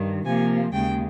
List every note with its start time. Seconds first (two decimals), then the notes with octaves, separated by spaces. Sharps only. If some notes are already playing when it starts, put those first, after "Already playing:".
Already playing: G2 D#3
0.26 C3 F3 A#3 G#5
0.73 D#2 C#3 G#3 G5